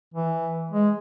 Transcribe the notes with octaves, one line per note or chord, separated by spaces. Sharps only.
E3
G#3